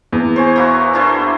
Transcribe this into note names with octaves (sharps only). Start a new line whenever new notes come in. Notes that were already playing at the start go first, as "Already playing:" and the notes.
E2
C5 C#5 G#5
A#3 E4 F#4
D4 E4 C5